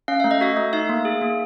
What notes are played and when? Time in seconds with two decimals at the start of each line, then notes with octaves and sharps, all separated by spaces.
0.08 C#4 F5
0.20 A3 E5
0.31 D#5
0.41 F#4 E5
0.57 A3
0.73 D#4 E5
0.89 A#3
1.05 G#4
1.21 A#3